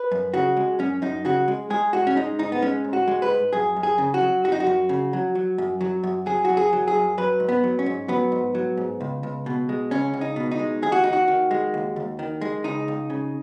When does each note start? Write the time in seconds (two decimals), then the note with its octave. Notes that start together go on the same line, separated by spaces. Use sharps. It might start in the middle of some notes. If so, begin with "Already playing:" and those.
Already playing: B4
0.11 F#2
0.34 C#3 F#4
0.57 G#3
0.79 F#2 C#4
1.02 F#2 D#4
1.25 C#3 F#4
1.48 G#3
1.70 G#3 G#4
1.93 G#2 F#4
2.07 C#4
2.16 G#3 D#4
2.39 G#2 D#4
2.52 B3
2.62 G#3 C#4
2.84 G#2
2.93 F#4
3.08 G#3
3.22 B4
3.30 G#2
3.53 F#2 G#4
3.77 F#2
3.83 G#4
3.98 C#3
4.14 F#4
4.21 F#3
4.44 F#2 F#4
4.52 D#4
4.60 F#4
4.66 F#2
4.89 C#3
5.13 F#3
5.35 F#3
5.58 F#2
5.81 F#3
6.03 F#2
6.26 F#3 G#4
6.45 F#4
6.50 F#2
6.57 G#4
6.73 F#3
6.88 G#4
6.95 F#2
7.18 F#3 B4
7.40 G#2
7.49 B3
7.64 F#3
7.79 C#4
7.86 G#2
8.08 F#3 B3
8.32 G#2
8.55 F#3
8.77 G#2
9.01 C#2
9.23 C#2
9.46 B2
9.69 G#3
9.91 C#2 C#4
10.14 C#2
10.21 D#4
10.36 B2
10.51 D#4
10.59 G#3
10.82 D#2 G#4
10.92 F#4
11.03 D#2 D#4
11.13 F#4
11.28 D#3
11.51 G#3
11.74 D#2
11.96 D#2
12.19 D#3
12.41 G#3
12.64 C#2 D#4
12.88 C#2
13.10 C#3